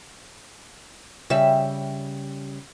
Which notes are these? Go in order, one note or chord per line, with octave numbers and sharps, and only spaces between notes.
C#3 G3 E5